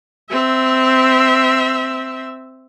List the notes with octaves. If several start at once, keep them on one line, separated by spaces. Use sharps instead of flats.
C4 E5